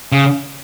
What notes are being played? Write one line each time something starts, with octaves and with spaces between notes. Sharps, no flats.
C#3